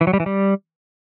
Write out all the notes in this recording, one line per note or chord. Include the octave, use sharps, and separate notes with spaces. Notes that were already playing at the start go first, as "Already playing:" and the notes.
E3
F#3
G3
E3
G3